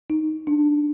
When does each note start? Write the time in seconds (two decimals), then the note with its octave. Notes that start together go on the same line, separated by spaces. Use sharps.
0.10 D#4
0.47 D4